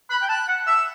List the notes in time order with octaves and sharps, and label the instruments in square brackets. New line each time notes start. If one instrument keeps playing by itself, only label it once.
[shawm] B5 [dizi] F#6
[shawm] G5
[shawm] A5 [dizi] F#6
[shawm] F#5
[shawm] E5 [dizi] E6